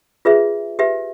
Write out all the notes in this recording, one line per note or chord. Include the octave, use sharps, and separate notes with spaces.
F4 G#4 B4 E5
G4 B4 E5